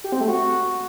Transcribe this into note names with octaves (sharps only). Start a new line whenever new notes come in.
G4
C4
A3
F#4